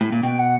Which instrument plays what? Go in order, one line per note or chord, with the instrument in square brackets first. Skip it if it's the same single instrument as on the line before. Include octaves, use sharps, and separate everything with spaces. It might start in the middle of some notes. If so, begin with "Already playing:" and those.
[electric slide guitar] A2
A#2
[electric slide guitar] B2 [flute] G5
[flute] F#5